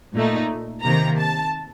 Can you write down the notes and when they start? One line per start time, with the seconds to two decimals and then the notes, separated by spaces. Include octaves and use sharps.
0.14 A#2 A3 D#4
0.84 C3 D#3 A#3 A#5
1.19 A5